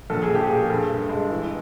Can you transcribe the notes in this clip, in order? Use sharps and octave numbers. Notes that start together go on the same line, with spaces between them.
A#1 A4
G#4
A#1
G4
A#2 G#4
G2 A4
G2
G#3
E3